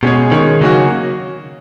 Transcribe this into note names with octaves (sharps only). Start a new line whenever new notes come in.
B2 G#3 C#4 G#4 C#5
D#3 G#3 C#4 G#4 C#5
C#3 F#3 A#3 C#4 F#4